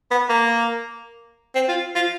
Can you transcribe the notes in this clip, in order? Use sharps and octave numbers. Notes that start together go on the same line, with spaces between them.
B3
A#3
C4
F4
F4